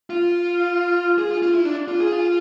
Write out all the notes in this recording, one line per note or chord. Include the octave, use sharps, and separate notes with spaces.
F4
G#4
F4
F4
E4
D4
F4
G#4
F4